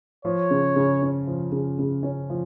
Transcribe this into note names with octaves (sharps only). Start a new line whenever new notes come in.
F3 C#5
C#3
C#3
C#4
F3
C#3
C#3
C#4
F3